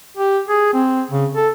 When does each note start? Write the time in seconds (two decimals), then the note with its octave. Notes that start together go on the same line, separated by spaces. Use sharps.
0.17 G4
0.49 G#4
0.73 C4
1.11 C#3
1.35 A4